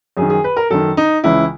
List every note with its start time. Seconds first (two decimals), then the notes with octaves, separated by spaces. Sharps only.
0.17 F#2 G#4
0.22 D#3
0.30 G#4
0.44 B4
0.57 A#4
0.71 F#2 D#3 A4
0.97 D#4
1.24 C#2 C#3 E3 E4